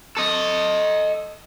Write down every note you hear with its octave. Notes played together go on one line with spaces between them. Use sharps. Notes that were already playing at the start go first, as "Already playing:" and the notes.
A4 D#5